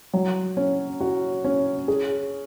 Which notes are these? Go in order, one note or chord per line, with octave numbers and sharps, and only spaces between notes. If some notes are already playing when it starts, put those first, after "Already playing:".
F#3
C#4
F#4
C#4
G#4